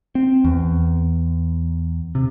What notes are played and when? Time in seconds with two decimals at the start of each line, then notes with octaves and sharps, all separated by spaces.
0.15 C4
0.45 E2
2.15 C3